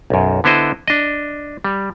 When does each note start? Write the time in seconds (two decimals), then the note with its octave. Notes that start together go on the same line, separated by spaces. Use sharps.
0.10 B1 F#2
0.44 D3 B3 E4 C5 D#5
0.88 D4 D#5
1.64 G3